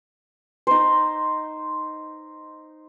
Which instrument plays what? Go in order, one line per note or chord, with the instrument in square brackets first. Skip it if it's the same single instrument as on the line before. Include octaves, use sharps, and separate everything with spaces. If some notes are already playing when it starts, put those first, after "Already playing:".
[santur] D#4 C5